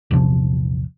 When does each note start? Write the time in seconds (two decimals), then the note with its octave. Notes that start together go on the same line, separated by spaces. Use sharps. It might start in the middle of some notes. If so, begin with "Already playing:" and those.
0.11 A#1 E2 C3 F3